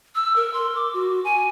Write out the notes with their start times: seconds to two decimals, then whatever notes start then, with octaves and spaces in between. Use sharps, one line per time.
0.15 E6
0.36 A#4
0.54 C6
0.76 D6
0.94 F#4
1.24 G#5